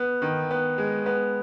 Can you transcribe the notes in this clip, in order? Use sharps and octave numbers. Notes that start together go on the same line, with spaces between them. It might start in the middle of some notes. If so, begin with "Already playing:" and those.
Already playing: B3
D#3
B3
G#3
B3